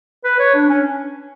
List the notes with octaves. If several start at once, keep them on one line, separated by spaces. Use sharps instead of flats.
B4
C#5
D4
C#4